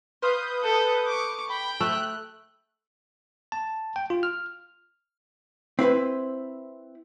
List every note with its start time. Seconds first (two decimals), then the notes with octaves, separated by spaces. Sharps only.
0.22 B4 C5 F5 D#6 G6
0.63 A4
1.08 C#6 D6
1.49 G5 B5
1.81 A3 F#6
3.52 A5
3.96 G5
4.10 F4
4.23 F6
5.79 C4 E4 B4 C5